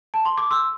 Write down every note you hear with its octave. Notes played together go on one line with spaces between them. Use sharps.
A5
C6
D6
C6 E6